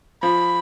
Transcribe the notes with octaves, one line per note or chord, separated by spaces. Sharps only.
F3 B5